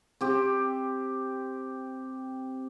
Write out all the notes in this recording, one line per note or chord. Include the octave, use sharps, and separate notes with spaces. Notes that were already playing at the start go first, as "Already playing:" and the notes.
C4 G4